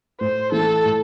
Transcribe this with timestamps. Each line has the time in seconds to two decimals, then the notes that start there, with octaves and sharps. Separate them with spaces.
0.20 A2 C5
0.52 E3 A3 E4 A4
0.85 A2